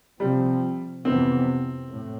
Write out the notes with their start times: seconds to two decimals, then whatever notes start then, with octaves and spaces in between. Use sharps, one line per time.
0.20 C3 F3 G3 C4
1.05 F2 C3 E3 B3 C4
1.90 A2